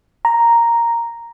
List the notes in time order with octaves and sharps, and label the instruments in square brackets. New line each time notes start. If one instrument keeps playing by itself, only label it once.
[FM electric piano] A#5